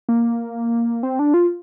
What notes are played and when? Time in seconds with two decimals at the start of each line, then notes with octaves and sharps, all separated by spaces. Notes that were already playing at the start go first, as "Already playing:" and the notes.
0.09 A#3
1.03 C4
1.19 D4
1.34 F4